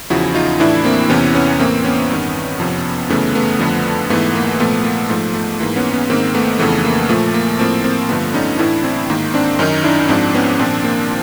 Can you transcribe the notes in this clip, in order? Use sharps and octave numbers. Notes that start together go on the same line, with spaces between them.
E2 C#3 F3 E4 F#4
D#4 F4
A2 E3 D4 E4
A#3 C4
E2 C3 E3 B3 C#4
B3 C#4
A2 E3 A#3 C4
B3 C#4
G2 D#3
F2 C3 F3
F#2 C#3 E3 A3 B3
A3 B3
F2 D3 F3
G#2 E3 A3 B3
A#3
A#2 F3 A3 B3
A#3
G#2 F3 A3
A3
G#2 E3 A#3
B3 C#4
B3 C#4
G#2 D#3 A#3 C4
A3 B3
F2 C#3 E3 A3 B3
A#3
A#2 F3 A3
A#3
A2 F3 A#3 C4
A#3 C4
G2 D3 F3 A3 B3
C#4 D#4
A2 E3 D4 E4
C4 D4
G#2 D#3 A#3
C4 D4
F#2 D#3 C#4 D#4
D4 E4
G#2 F3 C4 D4
B3 C#4
A#2 F3 C4 D4
A#3 C4